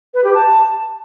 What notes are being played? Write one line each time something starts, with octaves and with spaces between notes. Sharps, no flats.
B4
G4
A5